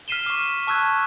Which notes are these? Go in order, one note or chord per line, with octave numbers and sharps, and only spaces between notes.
F6 B6 C7 D#7 E7 G7
C#6 D6
A5 C#6 E6 F#6 G#6